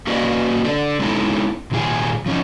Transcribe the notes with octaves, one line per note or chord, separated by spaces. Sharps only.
A#3 C#4 F#4 B4 D5 D#5
D4 A4 D5
G#3 B3 C#4 D#4 E4 A4
A#2 D#3 G3 F4 G#4
F3 C#4 D#4